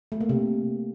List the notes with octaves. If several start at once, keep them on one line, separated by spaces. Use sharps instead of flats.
A3
A#3
C3